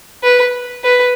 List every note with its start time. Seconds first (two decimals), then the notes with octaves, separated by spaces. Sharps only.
0.23 B4
0.84 B4